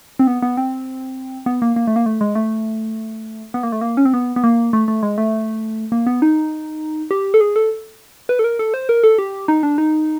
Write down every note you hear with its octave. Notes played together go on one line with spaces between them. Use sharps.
C4
B3
B3
C4
B3
A#3
A#3
A3
A#3
A3
G#3
A3
B3
A#3
A3
A#3
C#4
C4
B3
B3
A#3
A3
A3
G#3
A3
A#3
B3
D#4
G4
A4
G#4
A4
B4
A4
A#4
A4
C5
A#4
A4
G4
D#4
D4
D#4